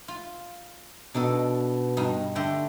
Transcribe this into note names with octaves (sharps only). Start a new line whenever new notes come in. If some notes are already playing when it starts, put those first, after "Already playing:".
F4
B2 D4 D#4 A4
G2 D#4
D3 A3 G5